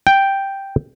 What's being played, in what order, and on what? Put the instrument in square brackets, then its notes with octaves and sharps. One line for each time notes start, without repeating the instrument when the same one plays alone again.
[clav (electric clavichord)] G5